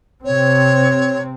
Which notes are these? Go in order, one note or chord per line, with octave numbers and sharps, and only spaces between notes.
C3 C4 C#5